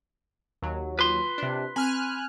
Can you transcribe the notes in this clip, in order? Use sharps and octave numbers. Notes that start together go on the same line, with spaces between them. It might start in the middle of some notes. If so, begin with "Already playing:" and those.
D#2 F#3
F4 B4 C6
C3 D4
C4 G#5 F6 F#6